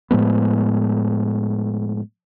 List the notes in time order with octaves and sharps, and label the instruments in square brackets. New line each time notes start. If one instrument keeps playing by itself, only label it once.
[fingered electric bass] A2 F3 G#3 B3